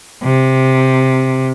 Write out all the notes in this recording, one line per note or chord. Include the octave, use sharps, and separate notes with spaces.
C3